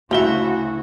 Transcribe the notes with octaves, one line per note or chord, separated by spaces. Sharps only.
D2 C#3 F3 E4 F#4 E5 G7